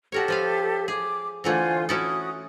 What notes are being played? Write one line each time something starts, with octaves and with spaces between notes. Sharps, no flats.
F#4 G4 A4 A#4 C#5
F3 B4 F5
G#4 D6
D3 E3 A3 F4 C5 G#5
C#4 E4 F#4 A4 D#6